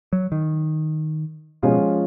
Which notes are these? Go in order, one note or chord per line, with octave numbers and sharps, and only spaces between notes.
F#3
D#3
B2 F3 G#3 C#4 F4